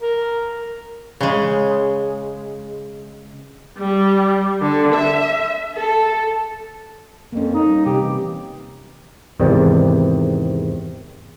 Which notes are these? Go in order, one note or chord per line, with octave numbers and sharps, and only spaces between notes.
A#4
C#3 G#3
G3
D3
E5
A4
F2 A#3 C#4
D#4
G3
C3 G4
E3
E2 G#2 C3 D#3 D5